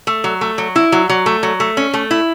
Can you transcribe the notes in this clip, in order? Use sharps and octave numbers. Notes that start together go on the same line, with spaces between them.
A3
F#3
A3
F#3
E4
F#3
F#3
A3
F#3
A3
C#4
A3
E4